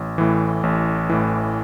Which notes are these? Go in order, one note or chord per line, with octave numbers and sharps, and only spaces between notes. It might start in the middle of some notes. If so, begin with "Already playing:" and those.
Already playing: A1
A2 E3
A1
A2 E3